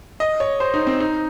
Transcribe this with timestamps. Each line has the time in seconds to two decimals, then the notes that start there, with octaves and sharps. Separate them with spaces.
0.20 D#5
0.40 C#5
0.60 C5
0.74 D#4
0.87 C4
1.00 D#4